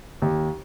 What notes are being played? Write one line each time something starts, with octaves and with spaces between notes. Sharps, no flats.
D#2